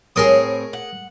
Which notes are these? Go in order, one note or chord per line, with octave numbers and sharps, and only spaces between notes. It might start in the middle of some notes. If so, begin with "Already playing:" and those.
A2 C4 G#4 A#4 C#5 D#6
F#5